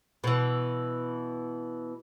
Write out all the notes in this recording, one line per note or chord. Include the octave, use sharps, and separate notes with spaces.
B2 E3